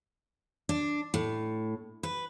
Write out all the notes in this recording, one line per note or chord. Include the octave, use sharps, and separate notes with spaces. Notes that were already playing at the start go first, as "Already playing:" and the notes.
D4
A2
B4